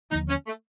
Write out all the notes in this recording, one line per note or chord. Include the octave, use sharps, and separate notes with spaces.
D#2 D3 F3 A#3 D#4
C#4
A3